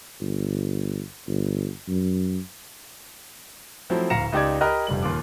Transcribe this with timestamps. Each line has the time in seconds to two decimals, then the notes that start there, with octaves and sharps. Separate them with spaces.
0.21 G1
1.28 G1
1.88 F#2
3.90 F3 F#3 A3 C4 E4
4.10 D1 F5 A#5 A#6 C#7 E7
4.32 C#2 D#4 G4 D5 D6 G#6
4.61 G4 A#4 D#5 B5 F6 F#6
4.87 F1 G2 G3 F#7
5.03 D#2 A#2 F4 D6